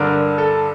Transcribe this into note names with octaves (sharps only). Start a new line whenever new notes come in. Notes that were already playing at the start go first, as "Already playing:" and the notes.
Already playing: G2 D3 A#4
A4